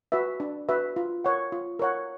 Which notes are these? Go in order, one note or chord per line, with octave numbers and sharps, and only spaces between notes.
F#4 B4 E5
D4
F#4 B4 E5
F4
A#4 C#5 F#5
F4
A#4 C#5 F#5